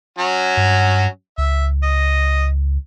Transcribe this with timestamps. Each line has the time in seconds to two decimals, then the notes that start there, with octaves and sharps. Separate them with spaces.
0.19 F#3 C#4 F#4
0.57 G2
1.38 C#2 E5
1.83 D#5